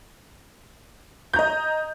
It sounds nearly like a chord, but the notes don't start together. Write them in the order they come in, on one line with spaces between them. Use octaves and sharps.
G6 A#5 D#5